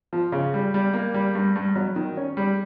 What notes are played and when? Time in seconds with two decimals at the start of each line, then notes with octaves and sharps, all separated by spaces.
0.13 F3
0.32 C#3
0.54 G3
0.74 G3
0.94 A#3
1.14 G3
1.35 G2
1.56 G2
1.76 F#3
1.96 D#3
2.17 C#4
2.37 G3